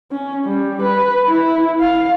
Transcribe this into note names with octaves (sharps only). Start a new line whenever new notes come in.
C#4
G3
B4
E4
F5